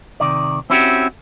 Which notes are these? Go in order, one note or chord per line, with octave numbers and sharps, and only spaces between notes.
C3 D#3 D5
C4 C#4 E4 F#4 G4